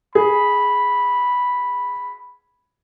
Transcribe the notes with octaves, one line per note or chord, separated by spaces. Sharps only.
G#4 B5